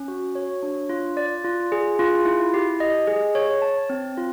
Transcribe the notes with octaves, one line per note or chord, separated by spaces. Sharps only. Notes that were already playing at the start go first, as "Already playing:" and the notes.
Already playing: C#4
F#4
C#5
D4
F4
D5
F4
G#4
F4
E4
G4
D#5
G#4
C#5
A5
C4
F4